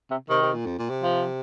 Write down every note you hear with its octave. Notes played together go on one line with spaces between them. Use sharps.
C3
C3 D#3
C3
A#2
F2
A#2
C3
F3